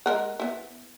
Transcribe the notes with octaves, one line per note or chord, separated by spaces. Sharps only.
G#3 A#4 F#5
B3 E4